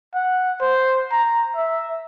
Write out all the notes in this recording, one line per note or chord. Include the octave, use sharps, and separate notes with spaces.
F#5
C5
A#5
E5